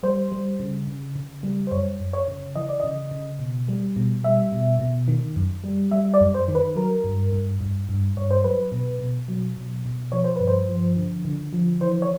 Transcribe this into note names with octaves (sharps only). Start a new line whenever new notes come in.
G3 C5
G3
C#3
C#3
C#3
G3
C5
F#2 C#5
F#2
C#5
C#3
E3 D#5
D5
C#3 D#5
C#3
B2
G3
B2
G3 E5
B2
B2
D#3
F#2
G3
G3 E5
D5
F#2
C5
D#3
B4
F#3 A#4
G2
G2
G2
G2
G2 C#5
C5
F#3 B4
B2
B2
F#3
B2
B2
F3 C#5
C5
G2 B4
C5
F3
D3
D3
F3
E3 C5
C#5